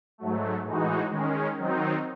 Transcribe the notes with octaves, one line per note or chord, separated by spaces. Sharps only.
G#2 F#3 A3
A2 E3 G#3 D#4 F#4
D#3 G#3 C#4
D#3 F#3 C4 D#4